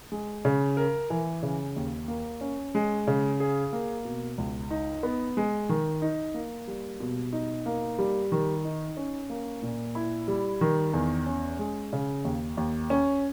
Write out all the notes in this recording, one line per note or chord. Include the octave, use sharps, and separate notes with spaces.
G#3
C#3
A#4
E3
C#3
D#2
A#3
C#4
G#3
C#3
G#4
A#3
B2
C#2
D#4
B3
G#3
D#3
D#4
A#3
G3
B2
D#4
A#3
G3
D#3
D#4
C#4
A#3
A#2
E4
G3
D#3
E2
C#4
G#3
C#3
D#2
D#2
C#4